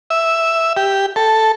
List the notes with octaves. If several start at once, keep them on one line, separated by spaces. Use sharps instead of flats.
E5
G4
A4